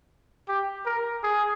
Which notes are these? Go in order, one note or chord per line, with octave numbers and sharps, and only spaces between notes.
G4
A#4
G#4